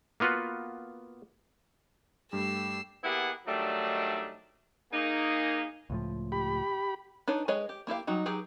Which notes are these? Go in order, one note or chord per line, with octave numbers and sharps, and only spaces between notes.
A#3 B3 F4 F#4 B4
G2 G3 A3 G4 E6 C7
A#3 B3 E4 G4 G#4 F#5
D#3 F#3 G3 A3 D4 D#4
A#3 D#4 G#4
C#2 A2 F3
G4 B5
D4 D#4 B4 C#5
G#3 G#4 B4 C#5 D#5
G4
A#3 E4 G4 F5
F#3 G3 D#4 F#4
F#3 D#4 G4 G#4 B4